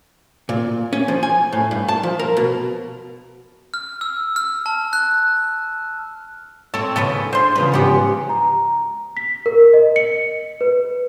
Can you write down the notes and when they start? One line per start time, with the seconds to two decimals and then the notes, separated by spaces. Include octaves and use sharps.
0.49 A#2
0.93 C#4
1.08 F3
1.23 G#5
1.53 A2
1.71 G2
1.88 A5
2.03 F3
2.19 A#4
2.37 B2
3.74 F6
4.01 E6
4.36 F6
4.66 A5
4.93 F#6
6.74 C4 A4 C#5
6.96 D#2 C#3 F3 A4 B4 C#5
7.33 D4 C5 C6
7.55 E2 C#3 F3 B4
7.72 G#2 B3 G4
8.29 A#5
9.17 B6
9.46 A#4
9.73 D#5
9.96 C#7
10.61 B4